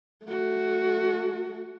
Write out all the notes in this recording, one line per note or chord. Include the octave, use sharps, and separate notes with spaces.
A3 F#4